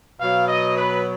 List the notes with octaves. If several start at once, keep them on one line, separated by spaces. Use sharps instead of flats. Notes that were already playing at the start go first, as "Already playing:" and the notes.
B2 F#3 F5
D#5
B4